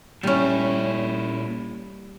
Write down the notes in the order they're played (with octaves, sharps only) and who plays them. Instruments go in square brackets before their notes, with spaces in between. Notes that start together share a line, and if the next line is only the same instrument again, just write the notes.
[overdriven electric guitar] A#2 E4 [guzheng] G3 C#4